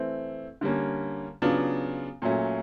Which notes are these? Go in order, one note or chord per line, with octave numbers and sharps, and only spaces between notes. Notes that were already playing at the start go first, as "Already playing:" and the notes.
Already playing: E3 A3 C4
D3 G3 A#3 C#4
C#3 F#3 B3 D4 F4
A#2 F#3 A3 C#4